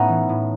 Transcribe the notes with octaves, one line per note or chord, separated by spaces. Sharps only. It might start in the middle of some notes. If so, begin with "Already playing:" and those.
Already playing: A2 A3 B3 C#4 D#4
E3
A2